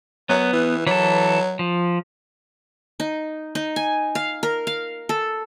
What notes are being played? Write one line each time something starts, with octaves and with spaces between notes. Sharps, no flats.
F#3 B3
E3
E3 F#3 A4
F3
D#4
D#4
G#5
F5
A#4
F5
A4